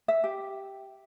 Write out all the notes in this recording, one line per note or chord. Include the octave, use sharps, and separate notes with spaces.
E5
G4